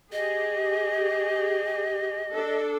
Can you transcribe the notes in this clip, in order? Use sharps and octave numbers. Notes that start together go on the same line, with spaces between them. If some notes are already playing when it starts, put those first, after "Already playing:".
G4 G#4 D#5
D4 A4